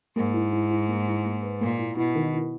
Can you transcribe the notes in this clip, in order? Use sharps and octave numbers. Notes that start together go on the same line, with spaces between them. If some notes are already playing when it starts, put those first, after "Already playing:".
G#2 A#3
E4
E4
E4
A#3
E4
A#3
B4
A#2 A#3
E4
B2 E4
D#3
E4